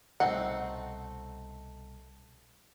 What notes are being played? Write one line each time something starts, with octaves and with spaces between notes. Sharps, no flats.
C2 B2 A3 C4 D#4 F#5